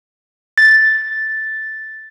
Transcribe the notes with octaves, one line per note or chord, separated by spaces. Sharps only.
A6